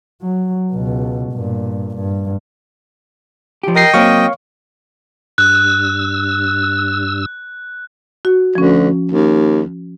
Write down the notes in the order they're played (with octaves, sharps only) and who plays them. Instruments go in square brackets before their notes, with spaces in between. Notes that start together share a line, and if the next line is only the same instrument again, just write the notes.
[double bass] F#3
C#2 B2
G2 A#2
G2
[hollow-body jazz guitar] F3 G4
[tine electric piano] A#4 A#6 C7 [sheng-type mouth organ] D#5 G5 D#6
[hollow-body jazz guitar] F#3 A#3 C4 [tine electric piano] C#5 F5 C#6
[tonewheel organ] G2 E6 [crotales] F#6
[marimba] F#4
[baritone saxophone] D2 [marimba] F3 C#4
[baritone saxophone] D#2